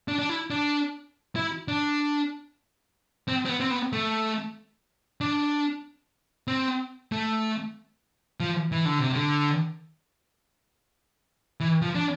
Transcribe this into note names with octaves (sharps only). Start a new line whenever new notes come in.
D4
D4
E4
D4
E4
D4
C4
C4
B3
C4
B3
A3
D4
C4
A3
F3
E3
D3
C3
D3
E3
F3
D4